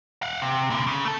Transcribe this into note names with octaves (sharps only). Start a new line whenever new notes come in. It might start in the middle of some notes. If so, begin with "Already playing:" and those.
F5 F#5
C3
A#2 D3
C#3
A3 A4